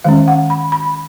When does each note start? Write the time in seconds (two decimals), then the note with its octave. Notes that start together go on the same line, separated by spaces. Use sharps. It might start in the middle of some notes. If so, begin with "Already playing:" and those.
0.04 D#3 G#3 C#4 F5
0.28 F#5
0.50 B5
0.72 B5